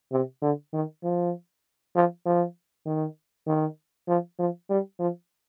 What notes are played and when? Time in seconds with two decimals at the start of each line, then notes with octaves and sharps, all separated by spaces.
0.12 C3
0.42 D3
0.73 D#3
1.04 F3
1.95 F3
2.26 F3
2.86 D#3
3.47 D#3
4.08 F3
4.39 F3
4.70 G3
4.99 F3